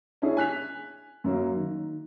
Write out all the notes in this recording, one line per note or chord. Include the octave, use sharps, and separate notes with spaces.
C#4 D4 E4 G#4
G#5 F#6 B6 F7
F#2 F#3 A#3
D#3